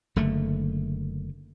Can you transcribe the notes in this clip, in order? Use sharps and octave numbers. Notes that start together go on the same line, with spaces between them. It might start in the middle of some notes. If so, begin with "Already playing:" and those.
F#1 D3 A3